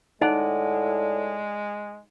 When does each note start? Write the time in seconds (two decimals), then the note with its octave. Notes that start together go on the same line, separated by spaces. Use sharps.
0.22 A2 G#3 D#4 D5 F#5